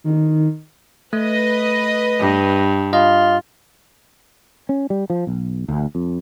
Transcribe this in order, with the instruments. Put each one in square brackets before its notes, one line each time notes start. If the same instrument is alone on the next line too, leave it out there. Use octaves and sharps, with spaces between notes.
[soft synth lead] D#3
[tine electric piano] A3 [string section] B4 D#5
[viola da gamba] G2
[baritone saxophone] F4 [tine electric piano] D#5
[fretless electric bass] C#4
G3
F3
B1
D2
F2